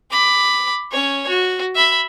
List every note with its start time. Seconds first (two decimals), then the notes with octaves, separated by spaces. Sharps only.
0.11 B5 D6
0.92 C#4 C#5
1.28 F#4
1.75 E5 B5